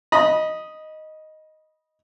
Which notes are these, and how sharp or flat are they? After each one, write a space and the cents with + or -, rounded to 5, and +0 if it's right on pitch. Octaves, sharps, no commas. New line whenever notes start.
D#5 +0 B5 -25